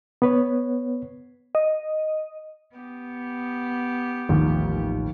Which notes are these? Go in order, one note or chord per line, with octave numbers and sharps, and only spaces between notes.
B3 B4 C#5
D#5
B3 G4
A1 D#2 A2 F3